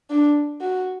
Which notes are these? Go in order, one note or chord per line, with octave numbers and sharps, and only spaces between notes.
D4
F#4